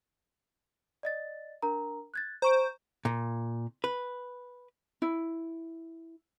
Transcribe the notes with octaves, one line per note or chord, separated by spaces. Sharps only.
D5 D#5 A6
D4 A#4 A#5
F#6 G#6 A6
C5 A#5 C#6 D7
A#2
B4
E4